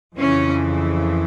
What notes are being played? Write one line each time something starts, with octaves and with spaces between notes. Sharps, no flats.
F2 C#3 E3 C#4